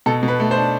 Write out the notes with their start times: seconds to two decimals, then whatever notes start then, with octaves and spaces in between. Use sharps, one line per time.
0.06 B2 A4
0.23 B2
0.28 B4
0.40 A3
0.51 C5
0.57 D4